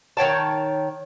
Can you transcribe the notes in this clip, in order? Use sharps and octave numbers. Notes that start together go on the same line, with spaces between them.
D#3 C#5 G5 A5